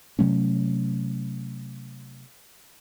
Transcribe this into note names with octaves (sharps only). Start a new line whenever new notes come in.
C3 F#3 A3 C#4